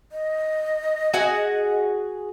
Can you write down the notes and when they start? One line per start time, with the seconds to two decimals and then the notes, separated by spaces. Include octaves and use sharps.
0.12 D#5
1.13 F#4 G#4 F#5